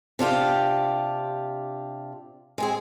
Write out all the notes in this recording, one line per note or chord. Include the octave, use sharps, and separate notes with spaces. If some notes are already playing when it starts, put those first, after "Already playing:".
C3 D4 F4 G4
G#3 C4 G#4